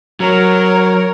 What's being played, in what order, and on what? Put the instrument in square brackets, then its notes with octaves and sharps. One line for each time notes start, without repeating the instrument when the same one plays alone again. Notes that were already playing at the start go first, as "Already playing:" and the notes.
[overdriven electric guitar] F#3 [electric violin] A#4 C#5